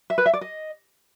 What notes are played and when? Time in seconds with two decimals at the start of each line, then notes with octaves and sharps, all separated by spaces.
0.10 E5
0.18 B4
0.26 E5
0.34 D5
0.41 D#5